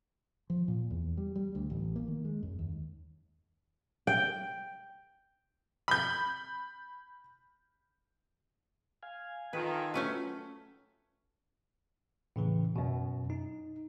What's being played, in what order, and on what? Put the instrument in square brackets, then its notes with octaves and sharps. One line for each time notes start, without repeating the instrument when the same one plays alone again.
[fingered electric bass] F3
A#2
E2
G3
G3
D2
A1
A#3
D#3
G#3
F#2
D#2
[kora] G5
[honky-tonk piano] B5 G6
[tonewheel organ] F5 G#5
[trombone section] D#3 [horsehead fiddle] F4 A4 [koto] B4
[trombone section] F#3 [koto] A3 C#4 B4
[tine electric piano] A2 C#3 E3
F#2 B2
D#4